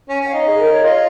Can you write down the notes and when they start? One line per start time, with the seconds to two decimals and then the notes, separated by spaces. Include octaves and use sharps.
0.08 C#4 G#5
0.21 C#4
0.27 F5
0.34 D#4
0.46 G#4
0.59 A#4
0.71 C#5
0.83 F4 D#5